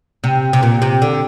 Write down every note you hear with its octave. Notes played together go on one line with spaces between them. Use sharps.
C3
C3
A#2
C3
D3